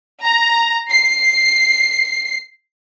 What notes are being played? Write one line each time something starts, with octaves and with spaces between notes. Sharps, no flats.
A#5
C7